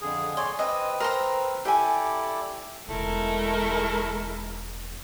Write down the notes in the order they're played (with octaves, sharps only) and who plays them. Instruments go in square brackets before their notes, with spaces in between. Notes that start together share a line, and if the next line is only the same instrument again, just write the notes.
[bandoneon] F2 D3 G#4
[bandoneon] C#5 D5 G#5 [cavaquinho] C6
[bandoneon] C4 B4 E6 [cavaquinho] D#5
[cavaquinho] A#4 C5 A#5
[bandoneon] E4 A4 D5 [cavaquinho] G4 G#5
[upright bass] E1 C#3 [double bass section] G#3 [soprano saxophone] A3 [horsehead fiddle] E4 A#4